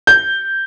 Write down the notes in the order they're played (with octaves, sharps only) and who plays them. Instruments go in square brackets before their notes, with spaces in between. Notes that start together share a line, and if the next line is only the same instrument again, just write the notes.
[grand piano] G6